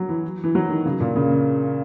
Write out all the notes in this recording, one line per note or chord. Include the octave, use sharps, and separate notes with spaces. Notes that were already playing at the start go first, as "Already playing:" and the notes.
Already playing: F#3
E3
E3
F#3
D#3
C#3
A#2
C#3